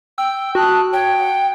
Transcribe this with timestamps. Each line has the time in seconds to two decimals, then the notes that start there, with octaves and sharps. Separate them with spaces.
0.18 G5 E6
0.55 F#4 A5 D#6 F#6
0.93 C#5 G5
1.18 F#5